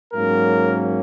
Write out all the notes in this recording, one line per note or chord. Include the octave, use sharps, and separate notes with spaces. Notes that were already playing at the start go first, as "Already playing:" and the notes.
G#2 F#3 A#3 C#4 A#4